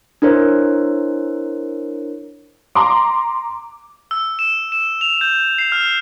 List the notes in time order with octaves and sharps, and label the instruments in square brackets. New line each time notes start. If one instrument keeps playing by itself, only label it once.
[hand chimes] D4 E4 A#4 C5 C#5
[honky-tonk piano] A#5 C6 D6
[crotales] E6
E7
E7
F7
G6
C7
F6